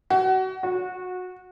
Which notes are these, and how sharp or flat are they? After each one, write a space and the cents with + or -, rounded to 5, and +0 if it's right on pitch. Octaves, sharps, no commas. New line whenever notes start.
F#4 +30
F#4 -20